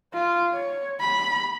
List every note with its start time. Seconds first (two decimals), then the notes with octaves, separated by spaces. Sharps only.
0.14 F4
0.54 C#5
1.00 B5